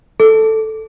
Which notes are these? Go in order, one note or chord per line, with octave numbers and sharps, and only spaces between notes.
A4